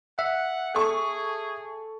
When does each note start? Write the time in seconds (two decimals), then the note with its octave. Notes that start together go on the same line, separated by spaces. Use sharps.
0.19 E5 F#5
0.75 G#4 A4 C#6